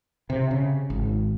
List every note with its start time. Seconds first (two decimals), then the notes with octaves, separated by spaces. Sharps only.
0.30 C3
0.51 C#3
0.90 G#1